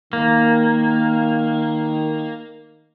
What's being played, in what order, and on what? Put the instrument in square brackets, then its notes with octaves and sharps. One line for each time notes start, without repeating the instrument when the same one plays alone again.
[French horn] D#3 [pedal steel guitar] A#3